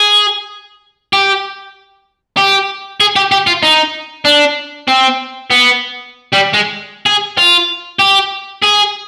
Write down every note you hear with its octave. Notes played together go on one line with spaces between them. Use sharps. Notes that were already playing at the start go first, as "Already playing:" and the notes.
Already playing: G#4
G4
G4
G#4
G4
G4
F4
D#4
D4
C4
B3
G3
G#3
G#4
F4
G4
G#4